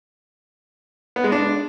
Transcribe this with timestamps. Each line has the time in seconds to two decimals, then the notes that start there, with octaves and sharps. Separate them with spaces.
1.16 B3
1.24 G#3
1.32 D4